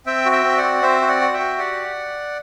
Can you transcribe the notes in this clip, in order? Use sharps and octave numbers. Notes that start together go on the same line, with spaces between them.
C4 E5 G5
F#4
E5 G5
C4
D5 F#5
F#4
C4 C5 E5
F#4
D5 F#5
F#4
E5 G5
F#4
G4 D5 F#5